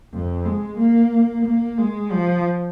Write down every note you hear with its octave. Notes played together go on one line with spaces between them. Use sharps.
F2
G#3
A#3
A#3
G#3
F3